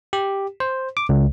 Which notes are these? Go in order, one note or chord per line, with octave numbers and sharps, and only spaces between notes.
G4
C5
D6
C#2